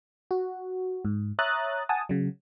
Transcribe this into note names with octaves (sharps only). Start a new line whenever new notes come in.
F#4
G#2
C#5 E5 A#5 D#6 F#6 A6
F#5 G#5 A5 D#6
C#3 F#3